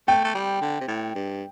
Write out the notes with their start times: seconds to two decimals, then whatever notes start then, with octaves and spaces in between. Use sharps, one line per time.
0.08 A3 G5
0.24 A3
0.35 G3
0.61 D3
0.81 C3
0.88 A2
1.15 G2